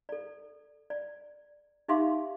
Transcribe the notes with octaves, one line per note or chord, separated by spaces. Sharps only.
A4 D5
D5
D#4 G4 E5 F5 C6 D6